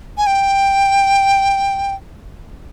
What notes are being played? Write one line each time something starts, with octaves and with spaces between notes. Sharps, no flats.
G#5
G5